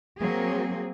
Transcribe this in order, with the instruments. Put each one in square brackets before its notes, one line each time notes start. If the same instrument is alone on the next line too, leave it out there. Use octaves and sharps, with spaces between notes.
[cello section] F#3 A#3 C4 G#4